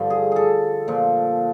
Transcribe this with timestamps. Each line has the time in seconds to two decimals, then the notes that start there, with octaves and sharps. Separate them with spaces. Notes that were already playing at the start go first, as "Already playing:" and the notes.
Already playing: G2 D3 F3
0.10 G#4
0.32 G#4 A4
0.88 A#2 F3